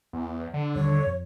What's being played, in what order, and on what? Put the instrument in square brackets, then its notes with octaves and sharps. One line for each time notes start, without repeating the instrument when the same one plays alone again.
[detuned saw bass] E2
D3
[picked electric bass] D#2 D#3 G3 [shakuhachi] C#5
[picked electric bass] F2